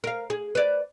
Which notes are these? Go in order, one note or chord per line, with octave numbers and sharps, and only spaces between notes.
A#4 F5
G#4
B4 D5